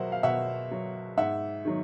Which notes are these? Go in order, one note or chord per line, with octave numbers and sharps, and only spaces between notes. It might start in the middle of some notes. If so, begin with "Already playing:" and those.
Already playing: B2 F#3 A#4 C5 E5 F#5
F5
B2 E5 F#5
F#3
G#2 E5 F#5
D#3 F#3